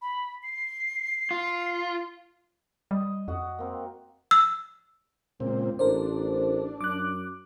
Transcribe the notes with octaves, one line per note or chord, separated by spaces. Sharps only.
B5
C7
F4
G3 D#5
F2 F#4 D#5 F#5
A#3 C4
E6
C#2 A#2 C4
A1 D4 A#4 C5
F#2 D6 F#6